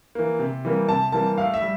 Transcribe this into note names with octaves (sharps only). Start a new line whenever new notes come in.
E3 A#3
C3
E3 G3 A#3
C3 A5
E3 G3 A#3 A5
A2 F5
E5
G3